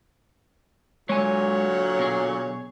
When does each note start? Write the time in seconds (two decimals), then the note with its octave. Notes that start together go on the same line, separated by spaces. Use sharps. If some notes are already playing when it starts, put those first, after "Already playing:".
1.09 A#2 D3 F#3 G#3 C#5 G#5
1.99 B2 G#4